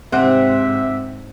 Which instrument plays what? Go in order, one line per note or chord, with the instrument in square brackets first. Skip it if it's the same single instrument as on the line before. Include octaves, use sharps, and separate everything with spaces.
[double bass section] G#2 [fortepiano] C3 F#5 [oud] C4 [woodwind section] E5